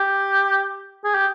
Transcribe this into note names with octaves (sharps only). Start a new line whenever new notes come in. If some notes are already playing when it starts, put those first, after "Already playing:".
Already playing: G4
G#4
G4